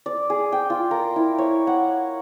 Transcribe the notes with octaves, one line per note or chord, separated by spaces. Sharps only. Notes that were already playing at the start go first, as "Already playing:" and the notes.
D5
G#4
G5
F4
A#4
E4
C#5
F#5